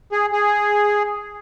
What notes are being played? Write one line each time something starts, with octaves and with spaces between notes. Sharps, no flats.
G#4
G#4